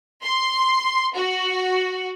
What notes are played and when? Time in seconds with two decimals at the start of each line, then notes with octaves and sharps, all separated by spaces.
0.23 C6
1.14 F#4